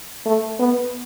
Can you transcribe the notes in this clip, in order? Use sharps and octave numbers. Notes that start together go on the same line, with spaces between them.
A3
B3